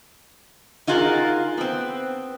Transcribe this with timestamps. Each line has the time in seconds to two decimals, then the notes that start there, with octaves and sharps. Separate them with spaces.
0.87 D#4 F4 F#4 G#4 A#4
1.58 B3 C4